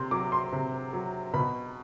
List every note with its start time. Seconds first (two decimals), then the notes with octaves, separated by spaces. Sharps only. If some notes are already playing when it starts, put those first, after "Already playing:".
Already playing: C3 C6
0.11 F#3 D6
0.32 C6
0.52 C3
0.93 F#3
1.33 B2 B5